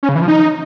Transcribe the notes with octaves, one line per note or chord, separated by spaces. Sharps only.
C#4
C#3
E3
F3
D#4